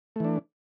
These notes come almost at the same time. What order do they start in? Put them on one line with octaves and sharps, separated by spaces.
A3 E3 D4